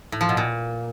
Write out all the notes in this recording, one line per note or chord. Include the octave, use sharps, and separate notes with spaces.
A2
F3
B2
A#2